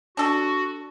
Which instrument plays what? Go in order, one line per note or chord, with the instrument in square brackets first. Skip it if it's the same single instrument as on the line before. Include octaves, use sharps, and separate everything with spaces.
[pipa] D4 A4 [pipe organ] F#4